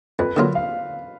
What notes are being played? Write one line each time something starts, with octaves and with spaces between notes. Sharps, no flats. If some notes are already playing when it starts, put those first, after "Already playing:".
F2 B4
D3 F#3 A#3 F4
F5